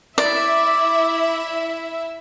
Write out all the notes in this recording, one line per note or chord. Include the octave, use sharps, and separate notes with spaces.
E4 D5 E5